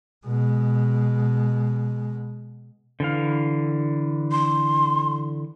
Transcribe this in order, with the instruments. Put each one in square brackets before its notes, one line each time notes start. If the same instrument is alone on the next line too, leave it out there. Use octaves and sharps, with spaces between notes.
[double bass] B2 G#3
[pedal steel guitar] D3 E3 F5
[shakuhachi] C6